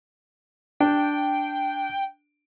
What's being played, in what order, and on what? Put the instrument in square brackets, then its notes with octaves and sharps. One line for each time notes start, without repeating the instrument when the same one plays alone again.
[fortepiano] D4 [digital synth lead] G5